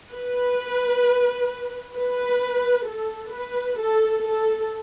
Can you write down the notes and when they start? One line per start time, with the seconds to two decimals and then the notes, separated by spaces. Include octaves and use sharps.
0.12 B4
1.96 B4
2.86 A4
3.33 B4
3.78 A4
4.24 A4